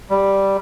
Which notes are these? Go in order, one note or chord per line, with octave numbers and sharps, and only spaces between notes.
G3